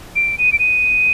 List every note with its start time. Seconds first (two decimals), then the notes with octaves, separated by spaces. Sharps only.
0.16 D7
0.38 D#7
0.53 D7
0.59 D#7